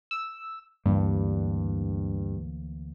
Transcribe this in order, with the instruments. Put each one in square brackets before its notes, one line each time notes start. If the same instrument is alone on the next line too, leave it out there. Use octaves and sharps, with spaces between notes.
[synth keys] E6
[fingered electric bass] D2 E3 A#3 [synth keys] G2